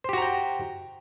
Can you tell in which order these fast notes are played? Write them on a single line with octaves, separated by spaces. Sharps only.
C5 G4 F#4 A#5 G5